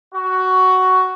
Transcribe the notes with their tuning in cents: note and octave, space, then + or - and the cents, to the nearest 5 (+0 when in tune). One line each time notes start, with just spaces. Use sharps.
F#4 +10